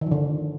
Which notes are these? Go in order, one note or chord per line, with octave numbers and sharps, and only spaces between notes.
D#3
F3
D3